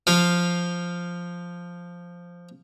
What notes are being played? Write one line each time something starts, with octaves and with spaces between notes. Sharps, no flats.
F3 F5